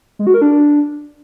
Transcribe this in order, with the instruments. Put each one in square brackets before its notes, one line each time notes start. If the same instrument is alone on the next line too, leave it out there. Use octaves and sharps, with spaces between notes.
[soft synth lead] G#3
F#4
A#4
D4